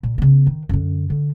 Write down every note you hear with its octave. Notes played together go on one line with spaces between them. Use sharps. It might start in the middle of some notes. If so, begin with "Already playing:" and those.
A#2
C#3 B3
D#3
F#2 D3
D3